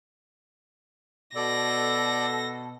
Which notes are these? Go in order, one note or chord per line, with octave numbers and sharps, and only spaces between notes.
B2 A4 D5 A#6